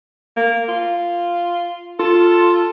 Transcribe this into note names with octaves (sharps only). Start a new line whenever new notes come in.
A#3
F4
F4 A4